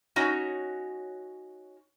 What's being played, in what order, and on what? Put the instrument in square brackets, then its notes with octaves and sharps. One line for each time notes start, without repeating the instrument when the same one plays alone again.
[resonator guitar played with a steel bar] C#4 D#4 F#4 C#5